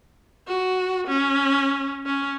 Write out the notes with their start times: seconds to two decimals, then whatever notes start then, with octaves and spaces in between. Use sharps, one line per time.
0.47 F#4
1.07 C#4
2.06 C#4